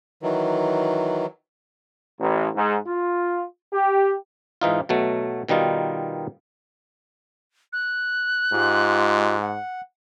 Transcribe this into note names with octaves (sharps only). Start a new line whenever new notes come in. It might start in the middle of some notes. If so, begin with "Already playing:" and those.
D#3 E3 F#3
A1
G#2
F4
G4
G#2 E3 D#4 F4
B2 F#3 A3
B2 D#3 G3 D#4 F4
F#6
G#2 G#3 F4 G4
F#5